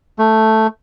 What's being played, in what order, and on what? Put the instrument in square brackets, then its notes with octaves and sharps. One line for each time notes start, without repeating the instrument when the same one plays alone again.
[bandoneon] A3